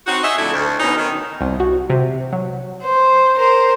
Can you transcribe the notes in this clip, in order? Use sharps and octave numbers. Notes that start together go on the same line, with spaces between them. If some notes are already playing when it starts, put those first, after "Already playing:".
C4 D#4 F#4
G#4 C#5 D#5 E5
F2 A2 D3 A3 E4
D2
D2 B2 C#4 D#4
D#3
C2
F#4
C3
F#3
C5
A#4 C5